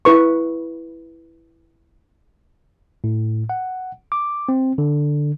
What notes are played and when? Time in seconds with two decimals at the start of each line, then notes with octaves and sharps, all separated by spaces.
0.05 E4 B4 C#6
3.04 A2
3.50 F#5
4.12 D6
4.49 C4
4.78 D3